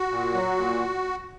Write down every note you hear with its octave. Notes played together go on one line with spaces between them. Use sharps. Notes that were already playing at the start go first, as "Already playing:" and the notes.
Already playing: F#4
A#2
F#3
A#2